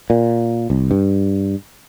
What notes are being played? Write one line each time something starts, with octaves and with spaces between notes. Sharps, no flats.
A#2
C2
G2